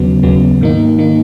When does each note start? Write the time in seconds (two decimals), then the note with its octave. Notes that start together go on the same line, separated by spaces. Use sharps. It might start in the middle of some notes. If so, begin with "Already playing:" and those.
Already playing: D#2 C#3 F#3 B3
0.23 D#2 C#3 F#3 B3
0.61 G#2 D#3 A#3 D#4
0.99 D#3 A#3 D#4